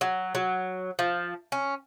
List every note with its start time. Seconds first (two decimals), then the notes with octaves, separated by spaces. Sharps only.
0.01 F#3
0.35 F#3
0.99 F3
1.52 C#4